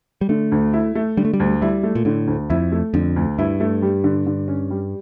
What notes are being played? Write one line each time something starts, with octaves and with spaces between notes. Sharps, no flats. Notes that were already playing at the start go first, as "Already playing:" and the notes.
G3
D3 A3
D2
E4
A3
D3 G3
A3
G3
D2
G3 E4
A3
A#2
A2 D3
D2
F2 E4
A3
F2 D3
D2
G2 E4
A3
G3
D3
D3
C#4
G3